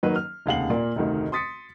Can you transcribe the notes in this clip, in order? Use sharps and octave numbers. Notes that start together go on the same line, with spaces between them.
D#3 F#3 A#3 B4
F6
F1 D#2 C#3 F5 F#5 F#7
A#2 A#3 D5
F1 D2 D#3
C6 D#6 A6 B6 C#7